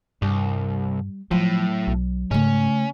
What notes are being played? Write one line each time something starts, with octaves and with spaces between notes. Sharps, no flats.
C2 G2 G3
A2 F3 F#3
B1
G#2 C#3 A3 C#4